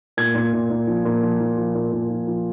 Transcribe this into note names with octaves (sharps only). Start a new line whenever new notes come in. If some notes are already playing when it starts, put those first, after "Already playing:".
A#2 G#6
A#2
A#2
A#2
F3
A#2
F3
F3
F3
A#2
A#2
F3
F3